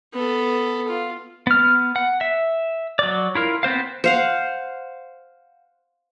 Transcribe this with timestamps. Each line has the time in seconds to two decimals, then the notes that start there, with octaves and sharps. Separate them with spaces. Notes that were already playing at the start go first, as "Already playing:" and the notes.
0.13 B3 A4
0.87 F4
1.47 B3 F6
1.96 F#5
2.21 E5
2.99 F#3 D5
3.35 E4 F4 A#4
3.63 B3 C4 C5 F5
4.04 C5 F5 F#5